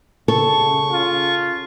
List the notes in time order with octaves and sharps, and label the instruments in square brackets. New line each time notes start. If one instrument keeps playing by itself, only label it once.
[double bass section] C#3 [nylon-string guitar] A4 [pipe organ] C#6
[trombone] F4